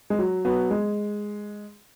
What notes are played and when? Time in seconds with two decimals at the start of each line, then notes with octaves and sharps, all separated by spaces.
0.10 G#3
0.19 F#3
0.45 F#3 B3
0.71 G#3